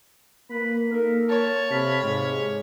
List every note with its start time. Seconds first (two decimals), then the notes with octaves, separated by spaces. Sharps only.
0.50 A#3 B4 B5
0.91 A#3 D#4 A4 A#4
1.30 C#5 A5
1.71 C3 A4 F5 B5
2.03 G#2 C3 G#3